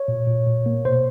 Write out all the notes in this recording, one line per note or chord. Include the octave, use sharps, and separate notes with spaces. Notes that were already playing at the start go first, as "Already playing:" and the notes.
Already playing: C#5
A#2
A#2
A#2
A#3
B2 C5